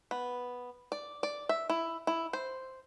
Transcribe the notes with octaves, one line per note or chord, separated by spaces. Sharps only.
B3
D5
D5
E5
E4
E4
C5